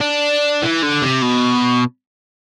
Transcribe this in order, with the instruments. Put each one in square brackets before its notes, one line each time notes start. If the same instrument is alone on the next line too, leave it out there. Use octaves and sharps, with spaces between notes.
[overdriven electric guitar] D4
E3
D3
C3
B2